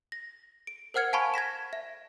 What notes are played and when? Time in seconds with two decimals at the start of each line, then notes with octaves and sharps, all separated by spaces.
0.12 A#6
0.67 D7
0.94 A#4 C5 F#5 F6 G#6 C#7
1.13 F5 G#5 A5 B5 C#6
1.34 G#6 A#6 B6 E7
1.73 E5